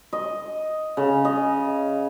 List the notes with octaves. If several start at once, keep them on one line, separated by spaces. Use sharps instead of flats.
D#5
C#3
D#5